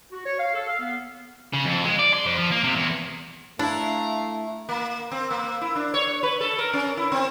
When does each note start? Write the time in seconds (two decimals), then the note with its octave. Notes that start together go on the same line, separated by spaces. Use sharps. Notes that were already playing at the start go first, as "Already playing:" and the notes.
0.12 F#4
0.25 C#5
0.39 F5
0.54 A4
0.68 F5
0.79 B3
1.54 C#3
1.65 F2
1.85 G#3
1.99 D5
2.14 C6
2.26 F2
2.38 F3
2.51 A#3
2.64 C3
2.75 E2
3.59 A3 D4 E4 F5 A#5
4.69 A#3
5.11 C4
5.31 A#3
5.61 E4
5.75 D4
5.94 C#5
6.23 B4
6.41 A4
6.58 A#4
6.73 C#4
6.97 E4
7.12 C4